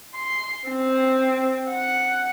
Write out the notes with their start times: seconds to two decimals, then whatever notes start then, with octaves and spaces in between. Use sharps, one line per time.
0.15 C6
0.69 C4
1.69 F#5